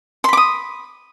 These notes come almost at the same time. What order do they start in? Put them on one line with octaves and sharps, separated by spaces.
C6 B5 D6 D#6